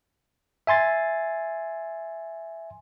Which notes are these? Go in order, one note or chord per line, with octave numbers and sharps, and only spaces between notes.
E5 G#5 C6 A6